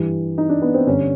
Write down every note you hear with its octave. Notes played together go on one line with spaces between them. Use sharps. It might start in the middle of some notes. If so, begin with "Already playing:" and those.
Already playing: G2 E3 G3
D#4
D4
B3
C4
G2 D3 G3 C#4